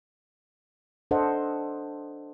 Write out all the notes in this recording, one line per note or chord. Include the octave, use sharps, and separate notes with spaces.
D4 A4 C5 D#5 F#5